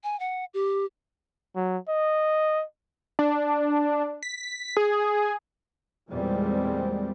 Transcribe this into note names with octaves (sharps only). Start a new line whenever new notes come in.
G#5
F#5
G4
F#3
D#5
D4
B6
G#4
E2 A#2 G3 G#3 C4